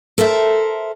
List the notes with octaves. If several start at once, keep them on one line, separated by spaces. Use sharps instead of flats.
A4 A#4 C5 E5